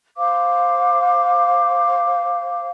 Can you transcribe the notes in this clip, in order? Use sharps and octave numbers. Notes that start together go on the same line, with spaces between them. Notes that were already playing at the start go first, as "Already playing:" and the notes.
C5 F5 D6